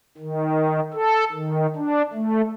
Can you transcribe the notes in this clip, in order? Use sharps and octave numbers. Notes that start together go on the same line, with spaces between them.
D#3
A4
D#3
D4
A3